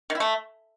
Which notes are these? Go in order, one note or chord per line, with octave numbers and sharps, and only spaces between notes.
D#3
E4
A3